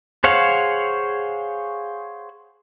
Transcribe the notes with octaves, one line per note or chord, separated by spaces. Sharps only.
G#4 C5 C#5 F5 F#5